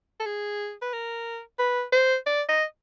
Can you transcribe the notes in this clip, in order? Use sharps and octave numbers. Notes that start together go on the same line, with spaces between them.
A4
G#4
B4
A#4
B4
C5
D5
D#5